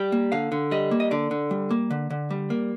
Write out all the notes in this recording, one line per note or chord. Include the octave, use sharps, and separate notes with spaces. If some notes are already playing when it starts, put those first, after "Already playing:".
Already playing: G3 G5
A#3
D3 F5
D3
G3 D#5
A#3
D#5
D3 D5
D3
G3
A#3
D3
D3
G3
A#3